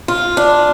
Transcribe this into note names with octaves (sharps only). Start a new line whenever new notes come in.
F4
D4